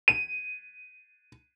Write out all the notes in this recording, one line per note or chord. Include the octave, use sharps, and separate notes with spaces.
D#7